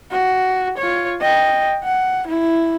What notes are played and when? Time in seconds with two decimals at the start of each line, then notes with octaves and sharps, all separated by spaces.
0.11 F#4
0.78 F4 C#5
1.21 D#5 G5
1.84 F#5
2.27 E4